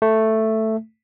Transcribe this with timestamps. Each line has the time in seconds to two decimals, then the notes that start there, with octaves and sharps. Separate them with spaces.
0.02 A3